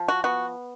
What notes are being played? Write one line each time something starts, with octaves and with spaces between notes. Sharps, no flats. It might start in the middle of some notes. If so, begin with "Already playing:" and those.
Already playing: F3
F#4
B3 F#4